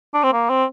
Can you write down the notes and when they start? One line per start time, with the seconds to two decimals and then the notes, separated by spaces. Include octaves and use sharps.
0.14 D4
0.23 C4
0.33 A#3
0.49 C4